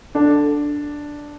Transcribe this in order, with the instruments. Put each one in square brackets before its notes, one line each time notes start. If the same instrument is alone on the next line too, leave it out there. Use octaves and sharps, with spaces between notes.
[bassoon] D3 [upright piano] D4